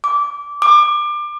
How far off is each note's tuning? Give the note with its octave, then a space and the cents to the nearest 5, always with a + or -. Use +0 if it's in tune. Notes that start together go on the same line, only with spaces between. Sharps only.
D6 -15
D6 +25